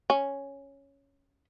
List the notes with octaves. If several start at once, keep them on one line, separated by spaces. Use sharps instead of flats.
C#4